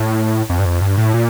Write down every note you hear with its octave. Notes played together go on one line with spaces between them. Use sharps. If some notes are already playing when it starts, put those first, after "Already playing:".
Already playing: A2
F2
G2
F2
G2
A2
A#2